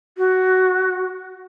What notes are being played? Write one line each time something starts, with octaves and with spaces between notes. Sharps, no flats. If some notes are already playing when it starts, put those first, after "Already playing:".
F#4